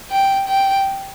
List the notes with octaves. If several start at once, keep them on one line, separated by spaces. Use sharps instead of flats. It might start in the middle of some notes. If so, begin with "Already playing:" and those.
G5
G5